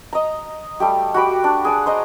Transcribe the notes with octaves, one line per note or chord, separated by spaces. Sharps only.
D#5 A#5
G3 A3 G4
F#4 G4 B5 D6
D4
G#4 D5 F#5
C5 D#5 A#5